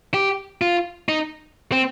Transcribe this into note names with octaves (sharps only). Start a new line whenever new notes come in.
G4
F4
D#4
C4